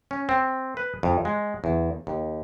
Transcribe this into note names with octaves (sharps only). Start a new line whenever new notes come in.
C#4
C4
B4
F2
G#3
E2
D#2